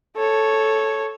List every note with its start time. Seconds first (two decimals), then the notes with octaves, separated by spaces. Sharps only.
0.16 A4 C#5